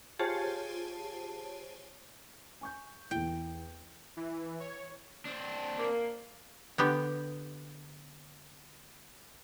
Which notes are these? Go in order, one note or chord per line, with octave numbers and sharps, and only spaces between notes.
F4 G4 G#4 C5 C#5 A5
G#5 C#6 G6
E2 E4 G5
E3
C#5
C4 D4
A#3
D3 B3 G4